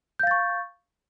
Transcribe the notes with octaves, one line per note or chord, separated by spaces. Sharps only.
F5 C#6 G6 A6